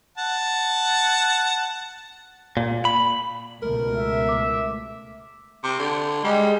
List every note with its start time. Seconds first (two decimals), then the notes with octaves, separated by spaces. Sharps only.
0.18 F#5 A5
2.57 A#2
2.85 B5
3.63 C#2 B2 A3 A#4
3.97 E5
4.29 D6
5.64 C3
5.79 D3
6.24 G3 G#3